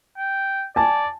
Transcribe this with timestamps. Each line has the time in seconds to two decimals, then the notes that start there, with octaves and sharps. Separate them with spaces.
0.18 G5
0.76 D5 G#5 A5